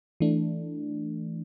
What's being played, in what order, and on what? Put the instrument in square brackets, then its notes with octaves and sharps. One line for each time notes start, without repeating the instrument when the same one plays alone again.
[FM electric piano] E3 A3 D4